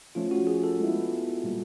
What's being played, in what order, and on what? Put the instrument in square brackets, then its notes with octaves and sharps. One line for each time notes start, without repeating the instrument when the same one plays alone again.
[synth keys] F3 A3 C#4 [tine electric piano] F4
[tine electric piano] F#4
G#4
A4
[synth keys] G#3 B3 E4
A#2 G3 A#3